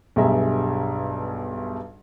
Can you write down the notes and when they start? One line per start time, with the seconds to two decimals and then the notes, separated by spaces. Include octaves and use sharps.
0.16 B1 G2 G3 G#4 E5 A#5